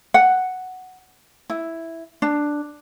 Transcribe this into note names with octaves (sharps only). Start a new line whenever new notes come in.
F#5
E4
D4